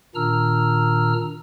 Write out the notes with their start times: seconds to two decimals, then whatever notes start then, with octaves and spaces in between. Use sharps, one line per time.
0.15 A#2 D#3 D4 A#5 E6 F6